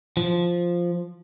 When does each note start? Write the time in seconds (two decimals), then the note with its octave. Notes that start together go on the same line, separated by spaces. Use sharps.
0.17 F3